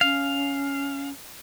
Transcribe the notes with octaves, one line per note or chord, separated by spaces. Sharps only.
C#4 F5